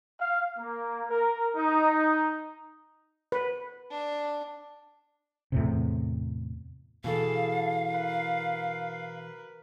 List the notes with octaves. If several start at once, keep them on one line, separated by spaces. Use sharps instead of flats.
F5
A#3
A#4
D#4
B4
D4
E2 A2 C3
B2 E3 G#4 A4 F5
A#4 B4